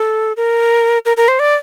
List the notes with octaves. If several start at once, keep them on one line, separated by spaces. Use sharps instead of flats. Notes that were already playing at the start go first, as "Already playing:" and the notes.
Already playing: A4
A#4
A#4
A#4
C5
D5